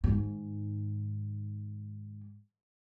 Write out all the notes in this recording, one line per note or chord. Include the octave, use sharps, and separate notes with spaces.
G#2 D#3